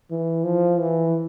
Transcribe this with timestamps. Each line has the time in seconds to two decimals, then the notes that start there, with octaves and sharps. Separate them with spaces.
0.11 E3
0.44 F3
0.80 E3